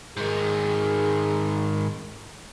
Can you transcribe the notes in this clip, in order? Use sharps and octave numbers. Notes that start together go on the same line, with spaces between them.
G#2 D#3 G#4